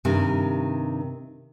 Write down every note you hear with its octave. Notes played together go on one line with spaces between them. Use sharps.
G2 C3 D#3